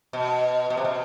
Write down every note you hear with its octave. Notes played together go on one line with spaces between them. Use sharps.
B2
B2
C3
B2